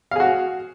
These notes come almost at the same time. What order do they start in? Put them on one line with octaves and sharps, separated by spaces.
F5 G#4 F#4